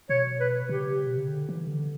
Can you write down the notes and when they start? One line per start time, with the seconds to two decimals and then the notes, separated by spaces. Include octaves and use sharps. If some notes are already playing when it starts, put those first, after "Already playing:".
0.09 B2 C#5
0.40 B4
0.69 C#3 G4
1.06 B2
1.17 C#3
1.28 D3
1.49 E3
1.68 D3